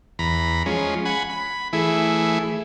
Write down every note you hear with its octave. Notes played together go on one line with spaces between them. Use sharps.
E2 A#5 B5
F3 G#3 C#4
F#5 G#5 B5
B5
E3 A3 E4 G#4